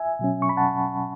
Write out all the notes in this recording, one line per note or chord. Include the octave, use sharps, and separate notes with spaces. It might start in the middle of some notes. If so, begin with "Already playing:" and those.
Already playing: E5 G#5
B2 F#3 C#4
C#6
B5
F#5 A5